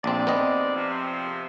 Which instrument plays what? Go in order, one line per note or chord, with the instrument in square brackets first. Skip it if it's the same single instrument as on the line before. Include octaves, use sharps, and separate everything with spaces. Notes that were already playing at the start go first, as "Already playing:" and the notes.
[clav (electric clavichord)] A#1 C4 [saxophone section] G#2 C3 D5
[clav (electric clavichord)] B3 C4 D#5
[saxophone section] C3 F3